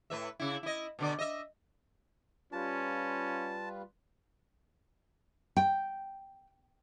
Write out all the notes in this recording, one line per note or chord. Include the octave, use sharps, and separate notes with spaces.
A2 B4 E5
C#3 E4
E4 D#5
B2 D3 D5
D#5 E5
G3 C#4 F4 B4 A5
G5